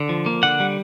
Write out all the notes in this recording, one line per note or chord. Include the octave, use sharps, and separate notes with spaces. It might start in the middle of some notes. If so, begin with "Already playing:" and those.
Already playing: D3
F3
A#3
D3 F#5
G3